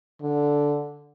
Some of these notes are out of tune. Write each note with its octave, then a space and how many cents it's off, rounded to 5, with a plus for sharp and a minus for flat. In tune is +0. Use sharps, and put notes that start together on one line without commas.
D3 -5